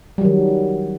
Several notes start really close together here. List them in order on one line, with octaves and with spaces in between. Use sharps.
G3 F#3 D#3